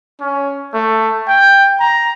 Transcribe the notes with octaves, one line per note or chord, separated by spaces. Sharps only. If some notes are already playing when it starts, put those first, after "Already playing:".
C#4
A3
G5
A#5